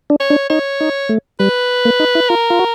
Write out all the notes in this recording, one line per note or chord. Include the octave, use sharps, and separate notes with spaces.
D4
C#5
D4
D#4 C#5
D#4
A3
G3 B4
A#3
D#4
E4
F4 A#4
F4
F#4